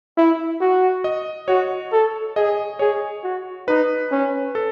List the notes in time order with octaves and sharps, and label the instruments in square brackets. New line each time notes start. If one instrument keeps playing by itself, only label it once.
[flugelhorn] E4
F#4
[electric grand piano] D#5
[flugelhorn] F#4 [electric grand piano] C#5
[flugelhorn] A4
[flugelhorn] G#4 [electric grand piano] D#5
[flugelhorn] G#4 [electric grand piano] C#5
[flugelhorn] F#4
[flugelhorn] D#4 [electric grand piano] B4
[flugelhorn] C#4
[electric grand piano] A4